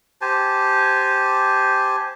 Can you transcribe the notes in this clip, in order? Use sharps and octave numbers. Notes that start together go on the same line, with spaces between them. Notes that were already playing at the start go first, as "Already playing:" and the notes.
G4 C5 G#5 A5